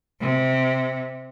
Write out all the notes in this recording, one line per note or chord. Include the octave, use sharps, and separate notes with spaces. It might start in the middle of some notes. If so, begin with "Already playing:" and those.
C3